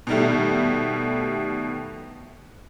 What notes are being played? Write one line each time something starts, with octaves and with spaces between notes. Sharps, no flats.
B2 D#3 G3 A3